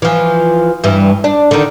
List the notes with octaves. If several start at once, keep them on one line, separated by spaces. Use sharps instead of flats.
E3 F3
G2 E3
D4
D3 D#3